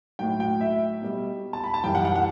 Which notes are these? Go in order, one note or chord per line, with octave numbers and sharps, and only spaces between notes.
A2 F#3 G5
G5
E5
B2 G3
A5
B5
A5
F#2 E3 G3 G5
F#5
F#5
F#5